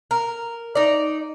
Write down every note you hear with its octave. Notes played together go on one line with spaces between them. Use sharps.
A#4
D#4 D5